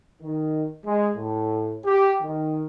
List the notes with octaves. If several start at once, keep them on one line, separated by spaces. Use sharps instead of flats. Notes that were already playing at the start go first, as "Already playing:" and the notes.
D#3
G#3
A2
G4
D#3